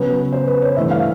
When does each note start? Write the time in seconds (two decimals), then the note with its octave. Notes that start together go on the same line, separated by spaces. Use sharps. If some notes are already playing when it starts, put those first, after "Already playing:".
Already playing: C#3 F#3 B3 B4
0.33 C5
0.47 B4
0.62 C#5
0.76 G2 E3 A3 E5
0.91 F5